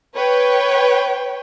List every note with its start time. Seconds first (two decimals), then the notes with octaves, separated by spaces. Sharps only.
0.16 B4 C#5 G5